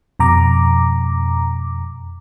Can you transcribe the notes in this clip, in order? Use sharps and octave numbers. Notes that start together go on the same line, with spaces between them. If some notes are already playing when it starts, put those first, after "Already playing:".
F2 B2 A#5 D6